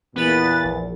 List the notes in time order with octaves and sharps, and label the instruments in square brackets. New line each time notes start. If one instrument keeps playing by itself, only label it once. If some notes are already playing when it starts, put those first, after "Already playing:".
[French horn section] E2 A#2 [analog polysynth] B3 B4 A6
[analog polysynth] A#1